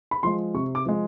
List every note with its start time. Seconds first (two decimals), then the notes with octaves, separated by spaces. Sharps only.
0.11 B5
0.23 F3 G#3 C6
0.54 C3 C#6
0.75 D6
0.86 F3 G#3